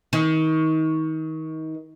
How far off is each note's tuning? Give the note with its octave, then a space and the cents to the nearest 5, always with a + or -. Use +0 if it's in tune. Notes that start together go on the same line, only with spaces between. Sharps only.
D#3 +30